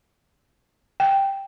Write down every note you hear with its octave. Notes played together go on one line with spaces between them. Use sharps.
G5